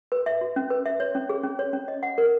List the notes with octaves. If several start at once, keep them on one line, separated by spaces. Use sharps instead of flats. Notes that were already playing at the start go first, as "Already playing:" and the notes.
B4
E5
F#4
C#4
B4
E5
C#5
C#4
G#4
C#4
C#5
C#4
D#5
F#5
A#4